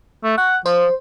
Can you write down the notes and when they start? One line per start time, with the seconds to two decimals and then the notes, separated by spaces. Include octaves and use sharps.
0.23 A3
0.38 F#5 C#6
0.66 F3 C5